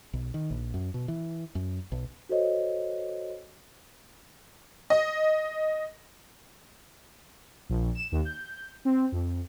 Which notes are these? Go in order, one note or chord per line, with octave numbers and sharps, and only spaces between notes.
B1
D#3
A#1
F#2
B2
E3
F#2
B1
F#4 A4 C5 C#5 D#5
D#5
A#1
E7
D#2
G6
C4
F2